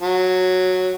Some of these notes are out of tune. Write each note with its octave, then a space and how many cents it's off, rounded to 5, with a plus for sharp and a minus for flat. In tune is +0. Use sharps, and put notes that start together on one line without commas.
F#3 -5